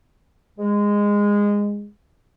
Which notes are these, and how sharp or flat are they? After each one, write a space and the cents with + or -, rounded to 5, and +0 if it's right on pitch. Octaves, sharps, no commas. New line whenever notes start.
G#3 -15